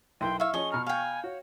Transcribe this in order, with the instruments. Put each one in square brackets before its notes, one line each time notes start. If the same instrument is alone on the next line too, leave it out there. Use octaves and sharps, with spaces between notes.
[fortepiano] B1 E4 A#4 [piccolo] G5 [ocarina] C6
[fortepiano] E4 [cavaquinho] E5 F5 [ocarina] C#6 [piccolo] E6
[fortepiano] F3 C#4 [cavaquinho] G#4 D#5 [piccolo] G7
[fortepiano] B2 A#5 [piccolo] F6
[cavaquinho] F5 G5 [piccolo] G#5
[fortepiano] F#4 [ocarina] C#5